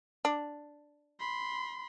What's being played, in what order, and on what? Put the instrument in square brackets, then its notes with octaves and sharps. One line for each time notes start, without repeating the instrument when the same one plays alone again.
[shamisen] D4
[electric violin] B5 C6